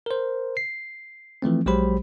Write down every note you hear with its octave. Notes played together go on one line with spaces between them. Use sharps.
A#4 C5
C7
E3 F3 A3 C4
A#1 F#3 G#3 G4 C5 B5